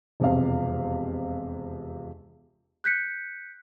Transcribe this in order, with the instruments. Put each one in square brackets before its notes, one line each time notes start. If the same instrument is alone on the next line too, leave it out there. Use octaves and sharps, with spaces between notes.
[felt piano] E1 F2 C3 F5
[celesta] F#6 G6 B6 C#7